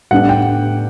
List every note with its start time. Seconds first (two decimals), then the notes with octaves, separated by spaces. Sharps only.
0.11 A2 G3 B3 D4 F#5
0.29 G5